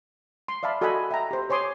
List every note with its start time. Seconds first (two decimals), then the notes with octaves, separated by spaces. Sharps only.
0.48 C6
0.63 D5 E5 F5 A5 B5
0.81 F#4 A4 D#5 F#5 G#5 B5
1.11 E5 G5 A#5
1.31 G4 C5
1.50 C5 C#5 G#5 C6 D6 D#6